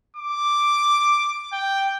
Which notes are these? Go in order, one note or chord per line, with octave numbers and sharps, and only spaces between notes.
D6
G5